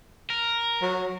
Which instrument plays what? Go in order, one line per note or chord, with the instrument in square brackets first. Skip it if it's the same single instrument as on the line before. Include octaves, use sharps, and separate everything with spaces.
[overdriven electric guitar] A#4
[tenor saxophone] F#3